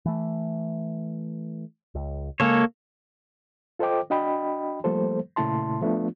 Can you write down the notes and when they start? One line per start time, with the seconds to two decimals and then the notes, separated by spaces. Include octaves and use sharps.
0.05 E3 A3
1.95 C#2
2.40 C#3 G#3 A#3 A4 C#5
3.79 F4 A4 C5 D#5 G5 D6
4.10 D4 F#4 D#5 G5 B5
4.84 F3 G3 A3 A#3 A4 C5
5.36 A#2 C#3 A3 E4 A5 C6
5.81 F3 A3 B3 D4 F4